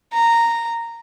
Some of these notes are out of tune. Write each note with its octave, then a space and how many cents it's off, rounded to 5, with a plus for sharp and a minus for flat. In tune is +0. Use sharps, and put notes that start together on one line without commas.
A#5 -10